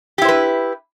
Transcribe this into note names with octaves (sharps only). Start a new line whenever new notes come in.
E4 G4 B4 C5